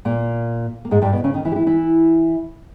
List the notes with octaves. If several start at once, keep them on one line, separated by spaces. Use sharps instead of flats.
A#2 A#3
A#3
G#2 G#3
G2 G3
B2 B3
C#3 C#4
D#3 D#4
E3 E4
G4
E3 E4
E3 E4